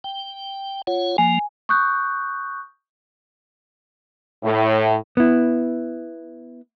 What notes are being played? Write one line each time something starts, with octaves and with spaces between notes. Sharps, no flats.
G5
F4 C#5 F#5
F3 A#3 G#5
C#6 D#6 F#6 G6
A2
B3 E4